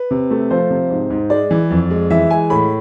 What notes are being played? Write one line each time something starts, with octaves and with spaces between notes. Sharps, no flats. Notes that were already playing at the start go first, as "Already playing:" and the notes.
Already playing: B4
C3
A3
F3 C5
C3
G#2
G#2
G#3 D5
E3
F2
G#3
E3 E5
G#3 G#5
A2 B5